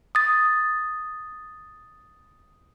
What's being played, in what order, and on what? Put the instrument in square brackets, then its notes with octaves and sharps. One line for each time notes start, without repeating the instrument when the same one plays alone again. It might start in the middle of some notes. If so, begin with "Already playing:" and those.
[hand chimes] D#6 A6